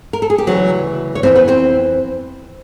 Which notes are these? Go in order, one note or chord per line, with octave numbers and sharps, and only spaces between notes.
A#4
A4
G#4
G4
D2 C#3 E3 F#3 F#4
C#5
F2 C#3 E3 C4 C5
B3 B4
C4 C5